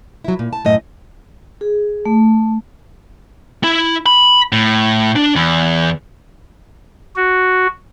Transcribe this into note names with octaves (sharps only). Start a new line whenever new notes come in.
F#3 E4
A#2
A5
F#2 A2 D#5
G#4
A3
E4
B5
A2
D4
E2
F#4